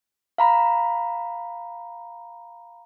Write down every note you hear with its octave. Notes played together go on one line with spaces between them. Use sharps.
F5 A#5 B5